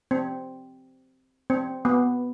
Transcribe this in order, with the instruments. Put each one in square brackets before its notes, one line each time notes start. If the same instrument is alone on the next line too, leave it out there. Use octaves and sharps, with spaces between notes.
[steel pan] C4
C4
B3